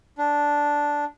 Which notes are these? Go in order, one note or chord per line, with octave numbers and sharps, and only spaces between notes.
D4